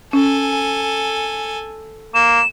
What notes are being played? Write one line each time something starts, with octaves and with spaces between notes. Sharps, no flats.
C#4 A4 G#5
A#3 E7